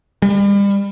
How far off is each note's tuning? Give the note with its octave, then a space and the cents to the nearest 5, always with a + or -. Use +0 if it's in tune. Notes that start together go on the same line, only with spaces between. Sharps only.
G3 +35